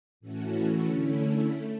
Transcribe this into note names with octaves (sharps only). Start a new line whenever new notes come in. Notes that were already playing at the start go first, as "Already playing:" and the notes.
A2 E3 A3 C#4 F#4
D3 A3 C#4 E4
A3